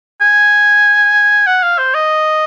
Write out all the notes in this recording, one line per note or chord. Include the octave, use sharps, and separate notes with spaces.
G#5
F#5
F5
C5
D#5